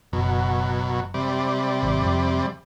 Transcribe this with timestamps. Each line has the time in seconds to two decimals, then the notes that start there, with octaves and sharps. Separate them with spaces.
0.13 F#1 B2 F#3
1.14 C3 G3 D5
1.83 G#1
2.03 F2